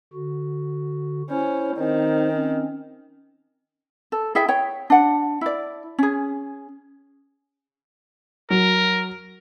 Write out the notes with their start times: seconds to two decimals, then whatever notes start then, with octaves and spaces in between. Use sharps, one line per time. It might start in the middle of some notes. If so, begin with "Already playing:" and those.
0.13 D3 F#4
1.30 C#4 E4 C5
1.77 D#3 C4 D#4 C5
2.30 C4 C#4
4.12 A4
4.35 E4 G#4 E5 G5
4.49 C#5 G5
4.90 D4 F#5
5.41 E4 D5
5.99 C#4 G#4
8.50 F#3 A#4